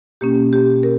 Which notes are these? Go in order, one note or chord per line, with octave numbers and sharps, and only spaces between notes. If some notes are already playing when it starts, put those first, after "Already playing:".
B2 A#3 C#4 G4
G4
A#4